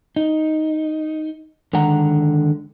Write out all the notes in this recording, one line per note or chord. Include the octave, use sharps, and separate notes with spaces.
D#4
D3 D#3 G#3 F#5 A#5